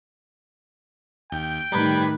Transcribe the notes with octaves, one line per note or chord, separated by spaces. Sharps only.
D#2 G5 G6
A2 D#3 G3 B4 D6 G#6